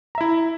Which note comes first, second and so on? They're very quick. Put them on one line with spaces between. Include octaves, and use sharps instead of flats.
A#5 E5 E4